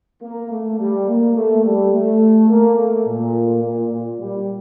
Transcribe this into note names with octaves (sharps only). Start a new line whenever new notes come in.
A#3
A3
G3
A#3
A3
G3
A3
A#3
A3
A#2
A#2
A#2
G3